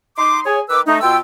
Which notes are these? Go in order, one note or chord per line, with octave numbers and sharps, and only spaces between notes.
D#4 C6 D6
G#4 C#5
D#3 B4 D6 E6
A3 D#4
B2 F4 G5 E6